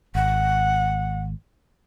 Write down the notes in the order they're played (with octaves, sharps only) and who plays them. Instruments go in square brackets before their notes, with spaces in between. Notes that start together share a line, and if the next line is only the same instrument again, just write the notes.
[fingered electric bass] G#1 [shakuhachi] F#5